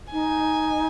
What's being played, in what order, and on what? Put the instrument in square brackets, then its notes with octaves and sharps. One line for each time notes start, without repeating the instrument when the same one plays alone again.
[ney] D#4 [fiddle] G#5